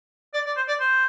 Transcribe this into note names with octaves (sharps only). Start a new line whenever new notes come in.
D5
D5
C5
D5
C5